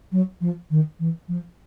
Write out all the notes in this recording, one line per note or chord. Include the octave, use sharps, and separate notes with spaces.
F#3
F3
D#3
E3
F3